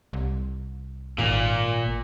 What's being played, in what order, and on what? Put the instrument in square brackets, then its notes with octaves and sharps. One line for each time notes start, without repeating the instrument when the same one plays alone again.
[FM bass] C2
[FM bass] G#1 [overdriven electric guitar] A#2